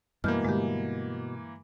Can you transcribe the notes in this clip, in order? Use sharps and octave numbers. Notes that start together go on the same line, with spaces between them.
F#2 B2 E3 G3 G#3 A#3 F6 G6
G2 D3 G3 G#3 G4